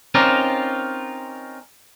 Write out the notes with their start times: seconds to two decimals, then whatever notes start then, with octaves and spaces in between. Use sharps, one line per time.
0.15 C4 C#4 D#4 F4 A#4 D5